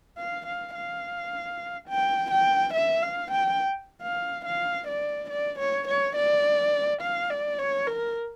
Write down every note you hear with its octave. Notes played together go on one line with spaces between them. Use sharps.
F5
F5
F5
G5
G5
E5
F5
G5
F5
F5
D5
D5
C#5
C#5
D5
F5
D5
C#5
A#4